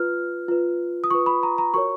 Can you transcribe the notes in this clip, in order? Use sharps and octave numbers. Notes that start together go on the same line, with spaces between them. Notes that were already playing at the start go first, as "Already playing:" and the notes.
Already playing: F4 B4 F6
F4 B4
D#6
F4 B4 C#6
B5
A#5
A#5
F#4 A#4 C#5 C#6